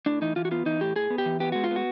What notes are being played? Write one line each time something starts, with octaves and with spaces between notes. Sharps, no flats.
A2 D4
E3 D#4
E3 F4
F#4
B3 F4
E3 D#4
A2 G4
A2 G#4
B3
G4
E3
B3 G4
G#3 F#4
F4
B3
F#4